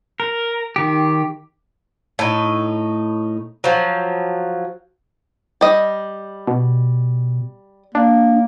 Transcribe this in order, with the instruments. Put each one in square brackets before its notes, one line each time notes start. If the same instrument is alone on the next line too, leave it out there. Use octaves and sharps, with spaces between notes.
[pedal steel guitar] A#4
D#3 G4
[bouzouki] A2 D#4
F3 F#3
[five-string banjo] G3 D#5
[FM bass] B2
[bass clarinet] A#3 [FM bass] D4